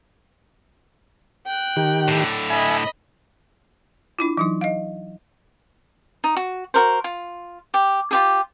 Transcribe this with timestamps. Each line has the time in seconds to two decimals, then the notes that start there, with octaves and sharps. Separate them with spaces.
1.46 G5 F#6
1.76 D#3 G4
2.08 A2 D3
2.50 D#5 E5 G#5 B5
4.19 D4 E4 F4
4.37 E3 F#3 D#4
4.61 D#5 F5
6.24 D#4
6.36 F#4
6.74 F#4 A#4 C5
7.04 F4
7.74 G4
8.11 F4 G4 G#4